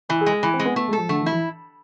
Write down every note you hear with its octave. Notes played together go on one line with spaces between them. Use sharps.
E3 E4
G#4
G#3
G#4
E3 E4
C4
G#3
B3
A3 B3
G#3
A4
F3
D3 A3
E3
E4
E3